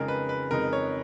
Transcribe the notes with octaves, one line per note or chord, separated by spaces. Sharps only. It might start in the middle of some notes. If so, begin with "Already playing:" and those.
Already playing: F2 C#3 G#3 D#4 A#4
B4
B4
F2 C#3 G#3 D#4 A#4
C#5